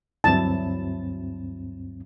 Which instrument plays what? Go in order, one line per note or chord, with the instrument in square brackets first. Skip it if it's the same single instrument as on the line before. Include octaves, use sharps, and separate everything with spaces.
[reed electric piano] D2 G2 C4 [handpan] F#3 E4 [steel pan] A5